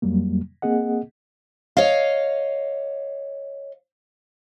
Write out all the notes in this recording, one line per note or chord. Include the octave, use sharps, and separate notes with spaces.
F2 F#3 G3 A#3
A#3 C4 G#4 D#5 F#5
C#5 D#5 F5